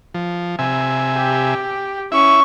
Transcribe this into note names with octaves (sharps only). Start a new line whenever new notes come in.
F3
C3 E5 G#5
G4
C#4 E4 E5 C#6